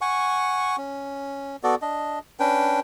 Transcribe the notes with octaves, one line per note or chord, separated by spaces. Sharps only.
F#5 G#5 C#6
C#4
B3 F#4 A4 D5
D4 D#5
C#4 D4 B4 G5